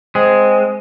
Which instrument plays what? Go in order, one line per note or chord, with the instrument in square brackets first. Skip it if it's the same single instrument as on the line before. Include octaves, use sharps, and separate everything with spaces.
[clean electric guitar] G#3 [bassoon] C4